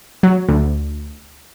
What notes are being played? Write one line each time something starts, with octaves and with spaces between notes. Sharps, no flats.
F#3
D2